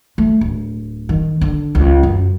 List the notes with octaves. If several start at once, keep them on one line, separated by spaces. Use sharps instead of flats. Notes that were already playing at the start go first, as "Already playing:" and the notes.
A3
D1
D#3
D3
C#2
F#2